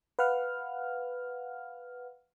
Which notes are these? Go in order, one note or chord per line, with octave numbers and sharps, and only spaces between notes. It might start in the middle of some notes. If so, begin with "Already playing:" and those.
B4 F5 F#5 F6